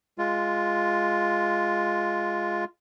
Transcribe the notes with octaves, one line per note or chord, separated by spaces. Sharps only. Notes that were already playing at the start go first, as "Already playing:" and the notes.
G#3 F4